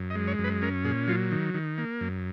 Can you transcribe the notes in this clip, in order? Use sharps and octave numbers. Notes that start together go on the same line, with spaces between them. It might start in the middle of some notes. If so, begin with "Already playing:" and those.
Already playing: F#2
D#5
G#3
C#5
F#2
B4
C#4 A#4
A#2 G#4
F#3 F4
D#3
D#3
A#3
F#2